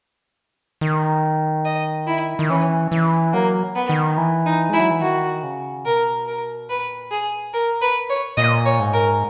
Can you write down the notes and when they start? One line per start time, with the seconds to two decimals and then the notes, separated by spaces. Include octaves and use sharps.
0.81 D#3
1.65 D#5
2.07 E4
2.39 D#3
2.49 E3 C#4
2.92 E3
3.33 F#3 A#3
3.75 B3
3.89 D#3
4.18 E3
4.46 D#4
4.70 G#3 E4
4.80 F#3
4.91 E3
5.01 D#3 F#4
5.43 C#3
5.85 B2 A#4
6.27 A#4
6.69 A#2 B4
7.11 G#4
7.54 A#4
7.82 B4
8.10 C#5
8.37 A#2 D#5
8.65 C#5
8.80 G#2
8.93 A#4